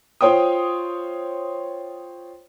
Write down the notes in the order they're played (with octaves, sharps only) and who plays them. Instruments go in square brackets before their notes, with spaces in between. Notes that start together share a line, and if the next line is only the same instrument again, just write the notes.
[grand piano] F4 C5 C#5 G5 D#6